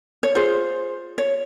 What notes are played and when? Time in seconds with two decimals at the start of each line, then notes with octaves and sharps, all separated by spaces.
0.23 C#5
0.35 F4 G#4 C5
1.18 C#5